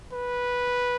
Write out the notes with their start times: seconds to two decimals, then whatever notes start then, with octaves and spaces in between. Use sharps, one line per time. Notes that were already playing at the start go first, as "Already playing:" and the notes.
0.13 B4